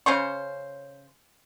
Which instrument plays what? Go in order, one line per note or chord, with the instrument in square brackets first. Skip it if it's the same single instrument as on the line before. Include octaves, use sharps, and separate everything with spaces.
[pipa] C#3 C#4 C5 C#6